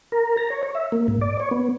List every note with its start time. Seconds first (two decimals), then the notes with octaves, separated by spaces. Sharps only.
0.12 A#4
0.37 A#5
0.50 C#5
0.63 C#5
0.75 E5
0.92 A#3
1.08 G#2
1.21 D5
1.40 C#5
1.51 B3